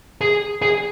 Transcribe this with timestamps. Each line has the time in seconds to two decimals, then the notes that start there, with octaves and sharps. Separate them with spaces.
0.21 G#4
0.62 G#4